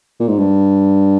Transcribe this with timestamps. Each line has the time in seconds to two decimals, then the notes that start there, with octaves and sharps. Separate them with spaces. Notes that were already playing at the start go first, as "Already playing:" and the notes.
0.20 A#2
0.28 G#2
0.38 G2